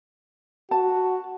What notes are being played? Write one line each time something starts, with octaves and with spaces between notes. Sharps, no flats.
F#4 A5